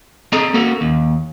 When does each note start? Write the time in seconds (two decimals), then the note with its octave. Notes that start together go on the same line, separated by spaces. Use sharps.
0.33 C4 G#4 A4 D#5 A#5
0.54 A#3 C#4 F#4 A4 A#4
0.81 D#2